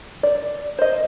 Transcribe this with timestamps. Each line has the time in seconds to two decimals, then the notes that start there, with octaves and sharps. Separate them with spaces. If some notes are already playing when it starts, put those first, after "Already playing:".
0.23 D5
0.79 C5 D#5